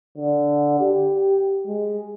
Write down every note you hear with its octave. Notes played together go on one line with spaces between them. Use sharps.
D3
G4
G#3